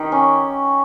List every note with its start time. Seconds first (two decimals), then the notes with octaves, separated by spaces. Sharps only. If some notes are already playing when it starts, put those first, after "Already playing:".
Already playing: D#3 G4
0.12 C#4